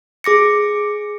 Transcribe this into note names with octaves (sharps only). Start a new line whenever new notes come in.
G#4 D6 A#6 C#7